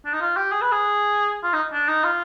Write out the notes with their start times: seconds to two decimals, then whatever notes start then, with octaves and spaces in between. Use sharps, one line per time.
0.05 D4
0.13 D#4
0.21 F4
0.37 G4
0.52 G#4
0.62 B4
0.72 G#4
1.43 F4
1.53 D#4
1.73 D4
1.88 D#4
2.04 F4